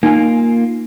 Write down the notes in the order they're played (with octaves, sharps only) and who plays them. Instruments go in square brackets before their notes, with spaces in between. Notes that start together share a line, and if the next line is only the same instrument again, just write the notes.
[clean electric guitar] A#3 F4 [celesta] D#4 G#5